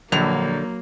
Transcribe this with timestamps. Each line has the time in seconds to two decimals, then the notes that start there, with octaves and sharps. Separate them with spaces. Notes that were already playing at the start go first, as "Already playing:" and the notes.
0.12 A#1 D3 F#3 A#3 F7